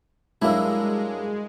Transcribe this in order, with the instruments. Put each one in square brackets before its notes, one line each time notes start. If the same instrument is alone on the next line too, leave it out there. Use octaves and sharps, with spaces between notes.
[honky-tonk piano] G2 F#3 E6 [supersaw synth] G#3 [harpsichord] A#3 D4 [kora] E4